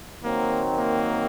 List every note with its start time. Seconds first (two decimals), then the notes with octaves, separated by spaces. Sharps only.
0.23 D#3 F#3 A#3 C4
0.79 A#3